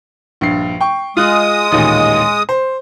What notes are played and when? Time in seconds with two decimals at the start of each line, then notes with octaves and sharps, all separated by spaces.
0.41 A#1 G2 C7
0.81 G5 C#6
1.17 G#3 F4 D#6 F#6
1.72 A1 D#2 A#2
2.49 C5